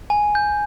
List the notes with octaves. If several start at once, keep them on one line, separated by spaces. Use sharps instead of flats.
G#5
G6